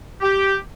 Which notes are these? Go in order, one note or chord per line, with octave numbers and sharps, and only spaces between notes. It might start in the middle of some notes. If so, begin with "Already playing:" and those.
G4